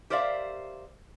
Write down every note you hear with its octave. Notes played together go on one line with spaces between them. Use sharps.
G4 A#4 C5 D5 E5 F5